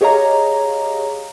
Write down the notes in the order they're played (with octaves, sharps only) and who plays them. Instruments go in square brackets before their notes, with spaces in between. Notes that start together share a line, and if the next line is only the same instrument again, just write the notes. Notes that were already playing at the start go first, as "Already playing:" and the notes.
[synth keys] G4 G#4 C#5 D#5 F5 A#5